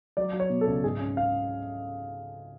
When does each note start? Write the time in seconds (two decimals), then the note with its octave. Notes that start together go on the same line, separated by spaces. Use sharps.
0.17 F#3 D5
0.33 F#3
0.40 C#5
0.50 B2
0.61 A4
0.67 C#2
0.84 G#2 G#4
1.00 C#4
1.17 C#4 F5